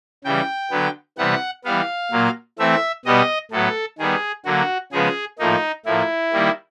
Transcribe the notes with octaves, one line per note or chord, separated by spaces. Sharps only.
C#3 E3 G3 G5
D3 F#3 B3
C3 E3 G3 B3 F#5
E3 G3 B3 F5
A#2 F#3 A#3
E3 A3 C4 E5
B2 G3 B3 D#5
A2 F#3 B3 A4
D#3 G3 B3 G#4
D3 F#3 A#3 F#4
C#3 F3 G#3 B3 G#4
A2 F3 A#3 D#4
A2 F3 A#3 E4
D#3 G3 A#3